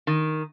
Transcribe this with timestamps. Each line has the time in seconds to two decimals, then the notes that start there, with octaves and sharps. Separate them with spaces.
0.07 D#3